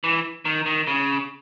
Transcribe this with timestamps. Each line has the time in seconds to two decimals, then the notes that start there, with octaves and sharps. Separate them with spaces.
0.04 E3
0.45 D#3
0.66 D#3
0.87 C#3